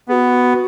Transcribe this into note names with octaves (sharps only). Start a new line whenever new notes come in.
B3 F#4 G#4